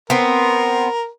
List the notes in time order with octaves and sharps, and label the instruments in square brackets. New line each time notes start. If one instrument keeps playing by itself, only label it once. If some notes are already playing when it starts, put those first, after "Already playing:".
[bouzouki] B3 C4 [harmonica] A#4